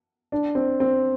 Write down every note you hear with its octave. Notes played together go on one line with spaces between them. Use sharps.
D4
C4
C4